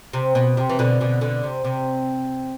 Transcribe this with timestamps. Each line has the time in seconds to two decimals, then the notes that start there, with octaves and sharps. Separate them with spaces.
0.13 C3
0.35 B2
0.57 C3
0.69 E3
0.79 B2 D3
1.01 B2 D3
1.21 B2 D3
1.43 C3
1.65 C3